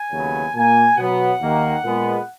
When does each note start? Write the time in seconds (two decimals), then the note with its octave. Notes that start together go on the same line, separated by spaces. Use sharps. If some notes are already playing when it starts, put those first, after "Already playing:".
Already playing: G#5
0.12 D#2 C#3 F#3 B3
0.55 A#2 A#3 G#5
0.97 B2 F#3 B3 F#5
1.40 D#2 D#3 A#3
1.83 A#2 G#3 B3